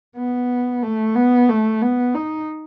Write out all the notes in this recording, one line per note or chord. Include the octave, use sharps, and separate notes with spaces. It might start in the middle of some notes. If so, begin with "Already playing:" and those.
B3
A3
B3
A3
B3
D#4